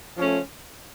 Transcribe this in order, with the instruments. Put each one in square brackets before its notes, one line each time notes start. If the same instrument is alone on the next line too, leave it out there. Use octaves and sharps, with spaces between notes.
[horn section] F3 A3 C#4